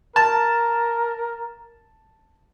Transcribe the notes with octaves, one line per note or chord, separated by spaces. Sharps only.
A#4 A5